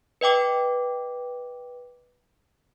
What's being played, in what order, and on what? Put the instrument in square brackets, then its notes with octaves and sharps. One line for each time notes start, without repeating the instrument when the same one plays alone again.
[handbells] B4 D#5 G5 D6